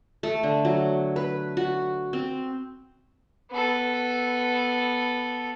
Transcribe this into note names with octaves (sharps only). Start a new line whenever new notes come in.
A3
D3
F#3
B4
F#4
C4
B3 A4